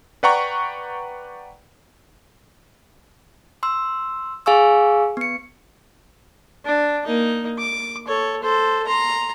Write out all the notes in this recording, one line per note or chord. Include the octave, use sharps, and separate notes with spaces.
B4 D5 F#5 G5 A#5 C#6
C6 E6
G#4 F5 G#5 C#6 E6
B3 C#7
D4
A#3 D#4
D6
A4 C#5
A4 C5
A#5 C6